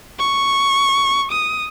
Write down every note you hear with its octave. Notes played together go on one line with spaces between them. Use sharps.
C#6
D#6